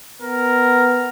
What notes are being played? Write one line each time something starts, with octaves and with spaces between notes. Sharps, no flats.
B3 A#4